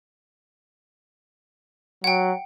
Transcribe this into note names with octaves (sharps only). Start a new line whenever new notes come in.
F#3 F#5 G5